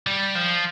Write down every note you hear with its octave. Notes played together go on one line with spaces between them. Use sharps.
G3
F3